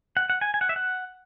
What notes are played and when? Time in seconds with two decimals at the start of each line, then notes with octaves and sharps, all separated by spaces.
0.17 F#5
0.30 F#5
0.41 G#5
0.54 G#5
0.61 F#5
0.69 E5
0.76 F#5